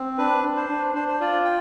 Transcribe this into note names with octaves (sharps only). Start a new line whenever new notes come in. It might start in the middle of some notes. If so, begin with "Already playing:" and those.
Already playing: C4
D4 B4
D4
C5
D4
D4 C5
C5
F4 D5
G5